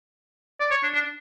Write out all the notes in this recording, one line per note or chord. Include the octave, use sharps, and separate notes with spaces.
D5
C#5
D4
D4